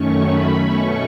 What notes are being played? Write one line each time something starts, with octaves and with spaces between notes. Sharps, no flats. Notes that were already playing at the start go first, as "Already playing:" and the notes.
Already playing: F#2 D#3 A3 C#4 C#6
B5
B2 A3 C#4 C#6